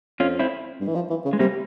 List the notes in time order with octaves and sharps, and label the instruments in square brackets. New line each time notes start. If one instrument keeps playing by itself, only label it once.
[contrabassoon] F2 [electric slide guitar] C#4 F4
[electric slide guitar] C4 E4
[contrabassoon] G2
E3
F3
E3
C#3
[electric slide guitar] G#3
[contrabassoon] C3 [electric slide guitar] G3 A#3